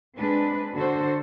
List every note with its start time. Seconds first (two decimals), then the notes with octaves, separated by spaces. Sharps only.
0.16 G#3 C4 D4 B4
0.74 D3 F#4 A4 C5